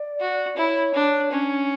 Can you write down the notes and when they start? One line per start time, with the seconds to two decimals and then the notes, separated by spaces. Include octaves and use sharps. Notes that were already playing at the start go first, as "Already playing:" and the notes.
Already playing: D5
0.20 F#4
0.57 E4 C#5
0.94 D4
1.31 C#4 D4